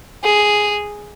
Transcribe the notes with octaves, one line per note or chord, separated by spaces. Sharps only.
G#4